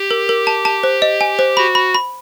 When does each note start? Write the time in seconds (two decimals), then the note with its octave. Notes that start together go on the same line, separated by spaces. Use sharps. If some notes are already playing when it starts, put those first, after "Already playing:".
Already playing: G4
0.11 A#4
0.29 A#4
0.47 A5
0.65 A5
0.83 C5
1.02 D#5
1.21 G#5
1.39 C5
1.57 F#4 B5
1.75 B5
1.94 B5